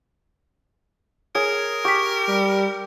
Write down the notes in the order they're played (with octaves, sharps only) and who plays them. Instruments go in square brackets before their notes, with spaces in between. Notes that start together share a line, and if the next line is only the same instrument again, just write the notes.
[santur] G#4 [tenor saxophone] A#4 [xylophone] C#5
[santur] G4 [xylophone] C#6 B6
[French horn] G3